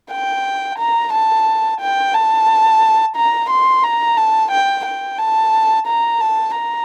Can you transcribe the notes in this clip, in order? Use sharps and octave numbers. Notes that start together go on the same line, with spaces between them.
G5
A#5
A5
G5
A5
A#5
C6
A#5
A5
G5
G5
A5
A#5
A5
A#5